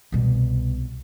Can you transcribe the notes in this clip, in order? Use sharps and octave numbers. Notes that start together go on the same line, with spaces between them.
C2 B2